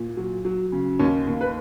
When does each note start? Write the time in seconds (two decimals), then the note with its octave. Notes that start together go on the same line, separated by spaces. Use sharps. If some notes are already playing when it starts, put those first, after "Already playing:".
Already playing: A#2
0.17 F#3
0.45 F#3
0.72 C#3
0.99 D#2 C#4
1.27 D#2
1.41 B4